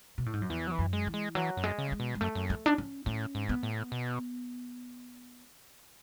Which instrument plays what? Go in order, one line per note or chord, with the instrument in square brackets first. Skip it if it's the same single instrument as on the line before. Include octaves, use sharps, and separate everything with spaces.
[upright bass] B2
A2
G#2
F#2
[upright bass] E2 [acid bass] E3
[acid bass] F#3
E3
[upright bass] F#2
[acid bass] G#3
[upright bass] E3
[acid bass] G#3
[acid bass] E3 [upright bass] F#3
[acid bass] F#2
[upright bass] G#3
[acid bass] C#3
[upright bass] G#3
[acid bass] B2
[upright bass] G#3
[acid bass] F#2 [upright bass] A3
[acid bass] F#2
[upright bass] A3
D4
C#4
[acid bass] A2 [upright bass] C#4
[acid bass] G#2
[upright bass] B3
[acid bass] A2
B2